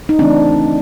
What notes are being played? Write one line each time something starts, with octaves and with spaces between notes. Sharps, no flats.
D#4
C#3 E3 A3 C4 D4